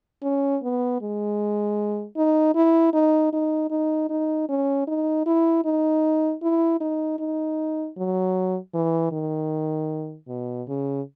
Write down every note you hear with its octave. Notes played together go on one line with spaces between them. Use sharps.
C#4
B3
G#3
D#4
E4
D#4
D#4
D#4
D#4
C#4
D#4
E4
D#4
E4
D#4
D#4
F#3
E3
D#3
B2
C#3